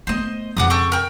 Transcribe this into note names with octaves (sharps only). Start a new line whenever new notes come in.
A3 B3 C5 D#5
F2 C#3 F#5 D6 D#6
A4 G5 C#6
A#4 G5